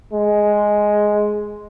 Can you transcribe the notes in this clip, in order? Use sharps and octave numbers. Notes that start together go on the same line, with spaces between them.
G#3